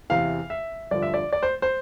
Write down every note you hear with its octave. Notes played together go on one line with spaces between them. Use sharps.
E2 C3 E3 F5
E5
G2 D3 F3 D5
E5
D5
D5
C5
C5